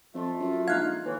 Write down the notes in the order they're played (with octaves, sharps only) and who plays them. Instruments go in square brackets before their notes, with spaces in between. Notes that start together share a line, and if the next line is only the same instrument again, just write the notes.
[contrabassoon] F2 [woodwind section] A3 F4
[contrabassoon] F#2
[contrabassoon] A#1 [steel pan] D#4 F5 [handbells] F#6 G#6
[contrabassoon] D#2 [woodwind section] A2 E3